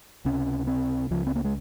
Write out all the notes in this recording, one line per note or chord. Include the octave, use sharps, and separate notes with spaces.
C#2 C3 C#4
C4
C#2 C#3 F3
C4
A#3
G#3